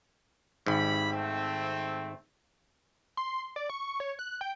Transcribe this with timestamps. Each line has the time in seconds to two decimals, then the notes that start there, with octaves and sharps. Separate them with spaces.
0.67 G#1 G#2 G3 E4 B5
1.13 A3 C4
3.17 C6
3.56 D5
3.70 C#6
4.00 C#5
4.19 F#6
4.41 G5